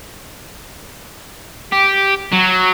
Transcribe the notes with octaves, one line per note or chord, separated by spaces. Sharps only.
G4
F#3